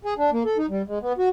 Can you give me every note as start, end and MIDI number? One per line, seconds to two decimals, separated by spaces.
0.05 0.14 68
0.18 0.30 62
0.32 0.43 58
0.45 0.57 69
0.58 0.66 63
0.69 0.82 55
0.88 0.99 56
1.02 1.13 59
1.18 1.29 66